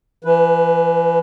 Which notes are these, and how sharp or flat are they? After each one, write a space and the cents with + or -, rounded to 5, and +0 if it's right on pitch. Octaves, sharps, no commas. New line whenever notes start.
E3 +35 B4 +0